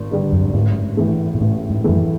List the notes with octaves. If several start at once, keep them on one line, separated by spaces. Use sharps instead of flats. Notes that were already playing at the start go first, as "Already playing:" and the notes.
Already playing: G#1
G2 D3 G3
F#2
G2
A1 G#2
A2 E3 A3
A#2
A1 A2
G#2
F#2 A2 E3 A3